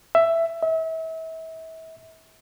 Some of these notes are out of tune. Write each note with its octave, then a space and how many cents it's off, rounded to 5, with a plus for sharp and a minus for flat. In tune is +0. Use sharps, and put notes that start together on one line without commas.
E5 +10
E5 -35